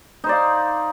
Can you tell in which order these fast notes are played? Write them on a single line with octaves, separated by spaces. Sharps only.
D#4 C5 D5 F5